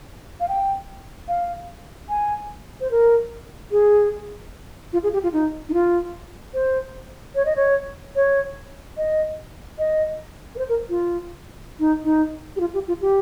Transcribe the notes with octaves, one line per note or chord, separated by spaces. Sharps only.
F5
G5
F5
G#5
C5
A#4
G#4
F4
G#4
G4
F4
D#4
D#4
F4
C5
C#5
D#5
C#5
C#5
D#5
D#5
A#4
C5
A#4
F4
D#4
D#4
G4
F4
G4
F4
G4